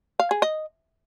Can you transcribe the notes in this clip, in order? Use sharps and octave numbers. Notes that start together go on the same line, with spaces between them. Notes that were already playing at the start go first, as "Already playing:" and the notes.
F5
G#4
D#5